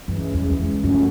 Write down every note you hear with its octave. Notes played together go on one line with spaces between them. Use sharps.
G2 C#3 E3 G#3
E2
E2
F2
G2 A#2 F3 A3 C#4 F#4